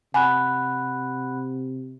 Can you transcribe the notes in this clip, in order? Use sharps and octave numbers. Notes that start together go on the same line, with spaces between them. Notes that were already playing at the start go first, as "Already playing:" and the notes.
C3 F#5 G#5 B5 F#6